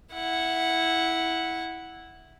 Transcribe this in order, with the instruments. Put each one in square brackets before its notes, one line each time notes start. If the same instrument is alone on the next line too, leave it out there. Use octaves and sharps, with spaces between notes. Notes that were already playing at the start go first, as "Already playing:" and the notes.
[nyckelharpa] E4 F#5